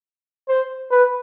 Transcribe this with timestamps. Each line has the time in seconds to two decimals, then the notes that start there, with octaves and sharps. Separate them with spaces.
0.49 C5
0.91 B4